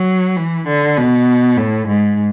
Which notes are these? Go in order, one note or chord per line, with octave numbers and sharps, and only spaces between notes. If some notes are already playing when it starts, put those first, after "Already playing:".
Already playing: F#3
E3
D3
B2
A2
G#2